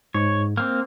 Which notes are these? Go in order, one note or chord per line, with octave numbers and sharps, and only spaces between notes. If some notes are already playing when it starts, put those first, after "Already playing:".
G#2 C#5
A#3 C4 F6